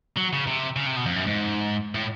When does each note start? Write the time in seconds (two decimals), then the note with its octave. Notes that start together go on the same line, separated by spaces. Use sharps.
0.17 F#3
0.33 C#3
0.47 C3
0.76 C#3
0.87 C3
0.97 B2
1.06 F2
1.16 F#2
1.26 G#2
1.95 A2